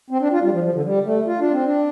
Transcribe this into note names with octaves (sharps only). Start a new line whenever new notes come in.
C4
D4
F4
G3
F3
F3
D3
G3
A3
F4
D4
C4
D4